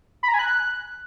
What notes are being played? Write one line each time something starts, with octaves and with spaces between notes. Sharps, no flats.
B5
A#5
G#5
F#6